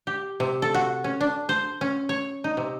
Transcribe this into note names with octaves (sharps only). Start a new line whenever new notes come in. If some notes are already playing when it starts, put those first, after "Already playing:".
G4
C3
A4
F#4
C#4
D4
C5
C#4
C#5
D#4
C3